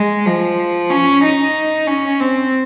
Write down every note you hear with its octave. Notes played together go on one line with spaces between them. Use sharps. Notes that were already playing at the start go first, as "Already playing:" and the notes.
Already playing: G#3
F3
C#4
D#4
C#4
C4